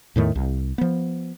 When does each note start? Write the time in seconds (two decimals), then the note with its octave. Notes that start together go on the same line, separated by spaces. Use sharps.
0.16 E2 A2 D#3 A3
0.35 C2
0.78 F3 B3